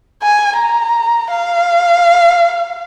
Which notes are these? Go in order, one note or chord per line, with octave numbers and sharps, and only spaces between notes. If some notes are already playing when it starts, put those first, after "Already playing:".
G#5
A#5
F5